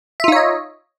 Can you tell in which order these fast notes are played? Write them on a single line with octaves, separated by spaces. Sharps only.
E5 F4 D#4 C#5 D#5